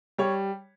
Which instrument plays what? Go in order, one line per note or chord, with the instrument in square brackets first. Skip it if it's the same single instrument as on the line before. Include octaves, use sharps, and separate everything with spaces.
[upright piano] G3 C#5